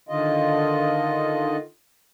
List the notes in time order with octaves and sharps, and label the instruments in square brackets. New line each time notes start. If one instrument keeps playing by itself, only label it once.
[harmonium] D3 D#3 F4 D#5